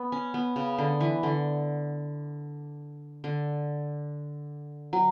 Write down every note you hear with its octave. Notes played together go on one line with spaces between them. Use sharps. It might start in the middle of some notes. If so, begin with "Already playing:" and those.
Already playing: B3
C#4
B3
C#3
D3
E3
D3
D3
F#3